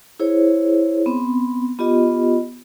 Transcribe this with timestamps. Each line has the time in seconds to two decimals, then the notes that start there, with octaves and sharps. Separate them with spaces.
0.19 E4 G#4 C5 C#5
1.06 B3 C4
1.79 B3 F4 G4 D#5